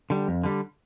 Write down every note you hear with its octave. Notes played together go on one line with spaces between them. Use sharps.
D3 G3
F2
D3 G3